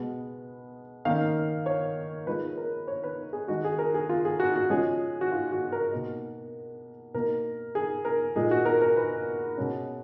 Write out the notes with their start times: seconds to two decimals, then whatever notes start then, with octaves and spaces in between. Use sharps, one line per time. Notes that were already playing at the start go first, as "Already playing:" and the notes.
Already playing: B2 G#3 B3
1.05 D#3 A#3 C#4 F5
1.66 C#5
2.27 F3 G#3 D#4 B4
2.58 A#4
2.88 C#5
3.04 B4
3.33 G#4
3.48 D#3 G#3 D#4 F#4
3.65 G#4
3.79 A#4
3.94 G#4
4.09 F4
4.25 G#4
4.40 F#4
4.56 F#4
4.70 F3 G#3 C#4 G#4
5.21 F#4
5.32 F4
5.52 F#4
5.72 A#4
5.92 B2 A#3 D#4
7.14 B2 A#3 D#4 A#4
7.75 G#4
8.05 A#4
8.36 A#2 G#3 D#4 G#4
8.51 F#4
8.65 A#4
8.81 A#4
8.96 B4
9.58 B2 G#3 C#4